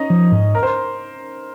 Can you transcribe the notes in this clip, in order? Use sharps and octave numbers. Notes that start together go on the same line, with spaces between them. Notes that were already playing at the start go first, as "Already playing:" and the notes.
Already playing: C#4 D#4 D#5
F3
G#2
A#4
C5